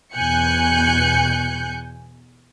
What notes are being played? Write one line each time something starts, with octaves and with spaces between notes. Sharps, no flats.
E2 B2 G#5 F#6 G6 C#7